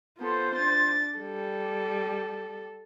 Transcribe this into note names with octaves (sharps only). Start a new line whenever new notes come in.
B3 F4 A4 C5
D4 A6
G3 A4